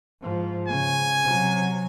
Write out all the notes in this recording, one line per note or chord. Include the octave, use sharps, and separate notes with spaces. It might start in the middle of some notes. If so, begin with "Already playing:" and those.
G#2 F3
C#3 G#5
C3 F#3